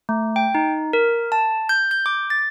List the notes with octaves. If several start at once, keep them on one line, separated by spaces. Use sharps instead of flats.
A3
G5
D#4
A#4
A5
G6
G6
D6
A6